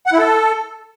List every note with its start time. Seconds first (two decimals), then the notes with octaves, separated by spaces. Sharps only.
0.06 F#5
0.12 E4
0.18 A4